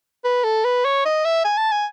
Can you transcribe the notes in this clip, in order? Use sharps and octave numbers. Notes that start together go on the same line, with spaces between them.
B4
A4
B4
C#5
D#5
E5
G#5
A5
G#5